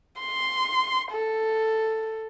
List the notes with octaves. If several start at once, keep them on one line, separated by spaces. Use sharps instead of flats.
C6
A4